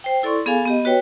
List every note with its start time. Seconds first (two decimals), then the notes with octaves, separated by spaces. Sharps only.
0.04 C5 G5
0.23 E4 A4 D5 C6 C#6
0.46 B3 G#4 A4 F5 G#5
0.65 B3 G4 D#5
0.85 F#4 B4 C#5 G5